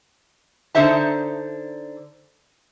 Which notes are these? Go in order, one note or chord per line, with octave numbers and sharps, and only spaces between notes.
D3 D#4 C5 E5 A5